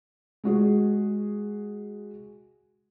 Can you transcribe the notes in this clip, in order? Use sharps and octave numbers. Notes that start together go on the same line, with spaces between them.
G#3 F#4 G#4